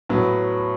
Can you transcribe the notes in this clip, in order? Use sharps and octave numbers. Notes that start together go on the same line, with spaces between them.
A2 F#3 B3